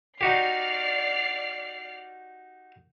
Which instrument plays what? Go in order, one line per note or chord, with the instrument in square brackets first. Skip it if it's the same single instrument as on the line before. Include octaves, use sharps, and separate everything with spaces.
[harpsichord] D#4 F#4 G4 [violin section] D5 F6 C7